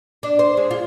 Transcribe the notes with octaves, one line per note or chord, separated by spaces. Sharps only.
D4
C5
G#3
F4